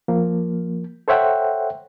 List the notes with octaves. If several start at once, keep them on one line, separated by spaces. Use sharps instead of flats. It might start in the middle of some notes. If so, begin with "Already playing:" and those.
F3 A#3
A4 C5 C#5 E5 F#5 G5